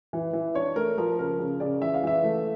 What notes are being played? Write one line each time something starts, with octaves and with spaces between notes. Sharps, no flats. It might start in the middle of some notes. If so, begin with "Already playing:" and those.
E3
E3
D4 C#5
A3 A#4
F3 A#4
C#3 A#4
C#3
C#3 D5
E3 E5
F5
E3 E5
A3